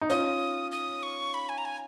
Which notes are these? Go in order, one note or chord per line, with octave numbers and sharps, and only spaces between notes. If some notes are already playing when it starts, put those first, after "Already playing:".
D#4
C#4 F4 D#6
D#6
C#6
B5
G#5
A#5
G#5